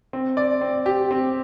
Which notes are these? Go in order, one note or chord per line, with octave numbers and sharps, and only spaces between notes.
C4
D5
C4
G4
C4